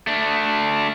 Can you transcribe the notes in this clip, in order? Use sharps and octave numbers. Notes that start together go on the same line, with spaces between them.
A3 D4